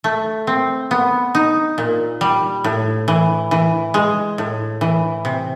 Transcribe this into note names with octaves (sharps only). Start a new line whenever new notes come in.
A3
C4
B3
D#4
A#2
G3
A2
E3
E3
G#3
A2
E3
C3